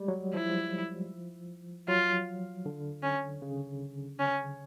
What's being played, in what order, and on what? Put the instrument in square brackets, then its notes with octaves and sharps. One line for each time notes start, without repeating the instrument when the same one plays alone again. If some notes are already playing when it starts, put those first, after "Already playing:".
Already playing: [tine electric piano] G3 G#3
F#3
[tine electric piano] F3 [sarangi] E4
[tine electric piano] F#3 [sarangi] F4
[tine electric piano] D3
[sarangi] C#4
[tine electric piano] C#3
[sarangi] C#4